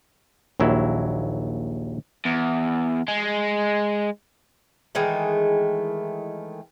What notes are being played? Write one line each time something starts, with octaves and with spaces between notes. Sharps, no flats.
A#1 D#2 F#3 E4
E2
G#3
D#3 E3 G#3 A3